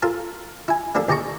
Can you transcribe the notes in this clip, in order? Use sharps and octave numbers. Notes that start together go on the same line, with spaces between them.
F4 A4 A#4 A5
E4 G#5
G3 A#3 D4 A4
D#2 G4 D#5 A5 A#5 C#6